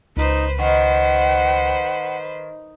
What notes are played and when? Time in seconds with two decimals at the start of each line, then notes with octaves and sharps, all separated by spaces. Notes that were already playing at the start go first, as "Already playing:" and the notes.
0.17 C#2 D#4 B4 C5
0.59 D#3 B4 C5 F#5